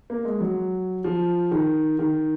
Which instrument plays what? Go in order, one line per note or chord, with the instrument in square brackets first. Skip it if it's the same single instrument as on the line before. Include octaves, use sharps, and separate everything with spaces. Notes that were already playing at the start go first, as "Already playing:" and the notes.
[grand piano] A#3
G#3
F#3
F3
D#3
D#3